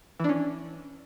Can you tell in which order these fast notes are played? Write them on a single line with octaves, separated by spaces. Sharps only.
E3 D4 C#4